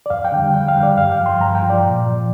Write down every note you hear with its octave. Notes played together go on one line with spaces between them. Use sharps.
D5
F2 F5
G5
D3 G3
F2 G5
F5
D3 G3
D5
G2 F5
G5
F3
C6
G2 A#5
G5
F3
D5
A#2
F3